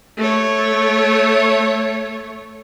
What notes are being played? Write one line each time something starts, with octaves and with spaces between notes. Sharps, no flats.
A3 C#5